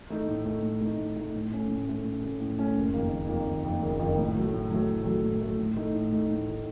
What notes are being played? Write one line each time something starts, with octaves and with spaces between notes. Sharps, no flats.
A3 D#4
A2
A3 D#4
A2
A3 D#4
A2
A3 D#4
A2
A3 C#4
A2
A3 C#4
A2
A3 C#4
A2
A3 C#4
F#1
F2 D#3 A#3
F#1
F2 D#3 A#3
F#1
F2 D#3 A#3
F#1
F2 D#3 A#3
A2
F#3 A3
A2
F#3 A3
A2
F#3 A3
A2
F#3 A3
A2
A3 D#4
A2
A3 D#4
A2
A3 D#4